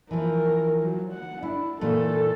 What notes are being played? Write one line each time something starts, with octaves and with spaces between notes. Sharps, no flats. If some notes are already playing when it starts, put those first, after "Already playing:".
E3 F3 A#4
F#3
F#5
D4 E4
A#2 E3 A3 A4